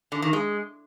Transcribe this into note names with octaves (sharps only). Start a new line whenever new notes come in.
D3
D#3
G#3